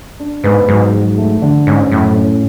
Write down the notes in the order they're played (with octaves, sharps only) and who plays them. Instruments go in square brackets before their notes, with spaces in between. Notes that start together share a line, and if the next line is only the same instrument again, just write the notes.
[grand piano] D4
[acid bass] G#2 [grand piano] B3
[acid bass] G#2 [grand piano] F#3
[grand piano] F#3
A3
D3
[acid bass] G#2 [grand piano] C#4
[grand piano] F#2 [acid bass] A2
[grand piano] C#4